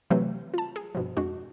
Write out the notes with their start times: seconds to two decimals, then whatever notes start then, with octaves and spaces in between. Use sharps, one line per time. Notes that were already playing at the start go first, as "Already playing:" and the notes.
0.10 C3 E3 F#3 A3 C4 B4
0.54 F4 A5
0.76 G#4
0.95 G2 B2 F3
1.17 F2 G#3 D4 F#4